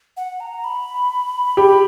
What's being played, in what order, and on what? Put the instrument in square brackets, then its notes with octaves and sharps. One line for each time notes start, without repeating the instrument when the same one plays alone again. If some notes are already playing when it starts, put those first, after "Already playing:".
[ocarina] F#5
A#5
B5
[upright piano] G4